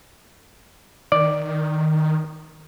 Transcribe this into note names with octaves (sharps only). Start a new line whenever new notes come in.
D#3 D5